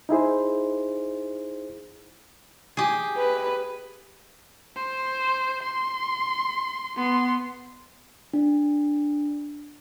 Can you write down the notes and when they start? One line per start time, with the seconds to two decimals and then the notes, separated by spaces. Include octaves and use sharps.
0.09 D#4 E4 G#4 C5
2.77 G4 G#4
3.17 B4
4.76 C5
5.63 C6
6.97 B3 C6
8.33 D4